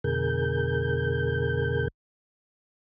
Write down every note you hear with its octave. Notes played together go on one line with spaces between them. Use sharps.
F2 B2 D3 G#4 A#4 G6